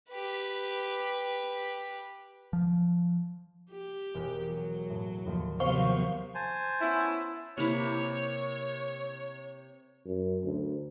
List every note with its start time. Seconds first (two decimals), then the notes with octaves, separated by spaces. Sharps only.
0.10 G4 B4
2.53 F3
3.70 G4
4.14 E1 A#4 F#6
4.48 F#3
4.90 A2
5.25 D#2 A2 F3
5.60 C3 D#3 F#3 B3 C5 F5 C#6
6.35 C5 G#5 A5
6.81 B3 C#4 E4
7.57 C3 A#3 E4 C#5
10.06 F#2
10.44 D2